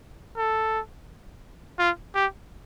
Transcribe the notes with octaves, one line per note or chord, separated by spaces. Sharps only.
A4
F4
G4